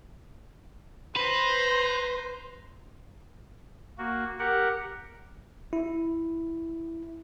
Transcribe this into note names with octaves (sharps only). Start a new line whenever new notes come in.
B4 C5 A#5
A#3 F#4
G4 A#4 F#5
E4